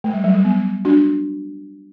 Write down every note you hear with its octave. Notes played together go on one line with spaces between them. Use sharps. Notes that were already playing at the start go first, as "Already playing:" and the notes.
A3
G3
F#3
G3
B3
D4 F#4